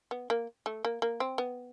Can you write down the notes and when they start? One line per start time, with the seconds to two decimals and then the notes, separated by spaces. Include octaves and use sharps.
0.11 B3
0.30 A#3
0.66 A3
0.85 A#3
1.02 A#3
1.20 C4
1.38 B3